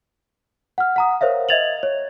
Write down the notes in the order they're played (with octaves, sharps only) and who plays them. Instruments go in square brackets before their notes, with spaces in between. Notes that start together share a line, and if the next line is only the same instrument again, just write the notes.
[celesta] F#5 F6
F#5 A#5 D#6
A#4 C5 C#5 E5 F5
D#5 E5 G#6 A6 F7 F#7
C#5